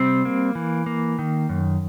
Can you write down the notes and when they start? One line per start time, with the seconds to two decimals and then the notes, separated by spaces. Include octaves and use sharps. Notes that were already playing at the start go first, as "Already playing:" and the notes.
Already playing: C3 G3 C4
0.25 A#3
0.55 E3
0.86 A#3
1.19 D#3
1.49 F#2